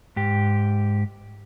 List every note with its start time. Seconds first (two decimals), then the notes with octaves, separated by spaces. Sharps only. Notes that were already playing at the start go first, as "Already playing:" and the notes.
0.16 G#2 G4